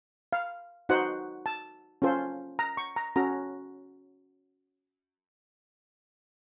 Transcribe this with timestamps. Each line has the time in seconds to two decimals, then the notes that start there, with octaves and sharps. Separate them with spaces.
0.33 F5
0.89 D#4 F#4 C5 F#5
1.46 A5
2.02 C#4 F4 A4 C5
2.59 A#5
2.77 C#6
2.96 A#5
3.16 C#4 F#4 A4 A#5